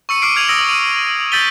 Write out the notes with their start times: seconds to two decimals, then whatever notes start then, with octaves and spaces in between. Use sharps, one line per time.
0.09 C#6 E6 C#7 D#7
0.22 D6 F6 C7 D7
0.36 D6 F6 G#6 F7 F#7
0.49 D#6 E6 A#6 D7
0.69 F6 D#7
1.32 E6 G6 A6 B6 D#7 G7